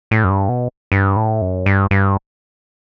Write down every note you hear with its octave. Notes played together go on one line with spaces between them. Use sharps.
A2
F#2
G2
B2
G2
A2
F#2
G2
G2